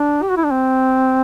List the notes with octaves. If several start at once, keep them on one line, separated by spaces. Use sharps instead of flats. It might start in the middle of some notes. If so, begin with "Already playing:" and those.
Already playing: D4
G4
F#4
E4
D4
C4